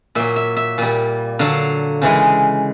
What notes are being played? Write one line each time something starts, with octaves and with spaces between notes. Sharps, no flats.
A#2 F#3 E5
E5
E5
A#2 G3
D3 F#3 F5
C#3 E3 G#3